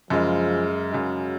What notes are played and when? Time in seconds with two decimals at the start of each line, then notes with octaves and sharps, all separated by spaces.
0.10 F#2 C#3 F3 G#3
0.92 F#2 C#3 F#3 G#3